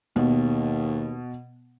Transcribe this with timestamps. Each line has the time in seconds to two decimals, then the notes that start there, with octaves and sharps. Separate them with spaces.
0.16 D#2 B2